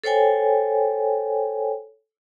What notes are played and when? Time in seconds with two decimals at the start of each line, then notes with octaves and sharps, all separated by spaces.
0.04 A4 C5 C#5 G5 G#5